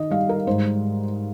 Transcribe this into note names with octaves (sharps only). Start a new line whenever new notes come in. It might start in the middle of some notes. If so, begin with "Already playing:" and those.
Already playing: D#3 D#5
G3 F5
A#4
G#2 C5